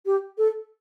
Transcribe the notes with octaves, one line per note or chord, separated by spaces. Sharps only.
G4
A4